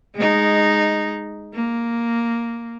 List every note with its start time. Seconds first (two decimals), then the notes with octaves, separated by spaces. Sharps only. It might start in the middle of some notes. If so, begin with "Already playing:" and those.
0.15 G#3 D#4
1.54 A#3